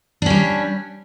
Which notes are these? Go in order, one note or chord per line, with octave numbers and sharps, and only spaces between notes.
G3 C#4 D4